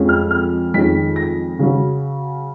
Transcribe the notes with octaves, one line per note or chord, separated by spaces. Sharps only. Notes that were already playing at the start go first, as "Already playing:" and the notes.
Already playing: F2 F3 G#3 C#4
F6
F6
F2 D#3 G#3 C#4 B6
A#6
C#3 F#3 C#4